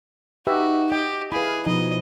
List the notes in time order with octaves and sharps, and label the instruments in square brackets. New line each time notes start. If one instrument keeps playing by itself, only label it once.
[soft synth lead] D#4 [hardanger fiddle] F#4 [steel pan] G4 B4 E5
[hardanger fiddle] G4 [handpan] D#5 [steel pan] G5
[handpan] E4 B4 [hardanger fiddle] G#4 [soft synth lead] F5 [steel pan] B5
[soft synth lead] B2 [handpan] F3 [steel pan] D#4 [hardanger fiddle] D#5